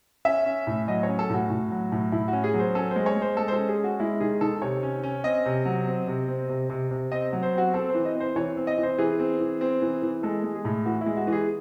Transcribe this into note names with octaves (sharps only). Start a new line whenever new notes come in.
C#4 E5
C#4
A2
F#3 D#5
C#5
C#4
A4
A2 F#4
A2
F#3
A2
A2 E4
F#4
C#4
G#4
F#3
C5
C#4 A4
C5
G#3
C#5
G#3
C5
G#3 A4
C5
A4
C#4
G#4
C#4
F#4
G#3 E4
D#3 G#4
D#3 A4
C3 C#5
C#4
C#4
C4 D#5
C3
F#3
C4
C3
C4
C3
C3
C3
C4 D#5
F#3
C5
C4 F#4
C4 A4
C5
E3
D#5
C4
C5
E3 C#5
C4
D#5
E3
C5
E3 G#4
C4
E3
C4
E3
E3
G#3 A4
G#3
G#4
A2
E3 F#4
G#3 E4
F#4
E3
G#4